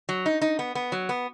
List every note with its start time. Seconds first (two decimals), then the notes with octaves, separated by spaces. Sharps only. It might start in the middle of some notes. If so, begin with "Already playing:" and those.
0.09 F#3
0.26 D#4
0.42 D#4
0.59 B3
0.75 B3
0.92 F#3
1.09 B3